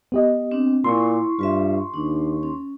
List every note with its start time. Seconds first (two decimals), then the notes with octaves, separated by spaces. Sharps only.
0.12 B3 G4 D#5
0.51 C4 D4
0.84 A#2 E4 C6 C#6
1.39 G2 F4 B4 E5
1.94 D#2 D4
2.43 C#4